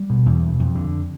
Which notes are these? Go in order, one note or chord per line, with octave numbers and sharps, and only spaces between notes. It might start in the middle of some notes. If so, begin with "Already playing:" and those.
Already playing: G3
B2
E2
B2
F2
D3